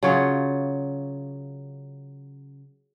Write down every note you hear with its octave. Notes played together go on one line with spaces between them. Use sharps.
C#3 F#3 F4 C#5